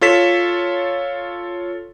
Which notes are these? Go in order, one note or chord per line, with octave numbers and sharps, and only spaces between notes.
F4 A4 C#5 B6 E7